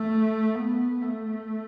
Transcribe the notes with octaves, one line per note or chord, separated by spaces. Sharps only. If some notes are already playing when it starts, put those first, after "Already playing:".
Already playing: A3
B3
A3